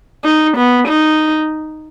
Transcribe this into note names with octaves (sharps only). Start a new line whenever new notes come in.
D#4
B3
D#4